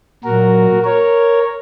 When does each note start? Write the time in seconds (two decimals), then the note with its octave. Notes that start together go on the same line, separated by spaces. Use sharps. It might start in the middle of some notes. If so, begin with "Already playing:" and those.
0.24 A#2 F#3 F#4 A#4
0.84 A#4 C#5